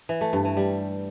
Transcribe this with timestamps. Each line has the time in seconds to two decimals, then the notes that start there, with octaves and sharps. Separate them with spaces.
0.09 E3
0.21 A3
0.33 G2
0.45 E3
0.57 G3